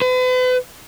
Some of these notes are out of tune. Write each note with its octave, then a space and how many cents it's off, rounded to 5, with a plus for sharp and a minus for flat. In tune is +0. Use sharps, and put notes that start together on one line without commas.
B4 +40